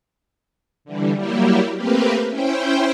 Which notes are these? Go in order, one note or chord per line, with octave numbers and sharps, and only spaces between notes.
D3 E3 G3
F#3 G3 A#3 E4 G4
A3 A#3 C4 G4 A#4 B4
C#4 E4 C5 G5